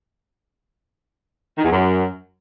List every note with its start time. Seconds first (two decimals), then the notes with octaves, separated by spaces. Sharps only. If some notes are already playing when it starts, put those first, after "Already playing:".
1.58 D#3
1.64 E2
1.71 F#2